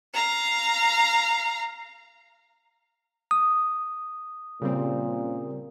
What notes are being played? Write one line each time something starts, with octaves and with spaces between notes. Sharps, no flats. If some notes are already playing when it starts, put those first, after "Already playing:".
F5 A#5
D#6
A#2 C#3 G3 C4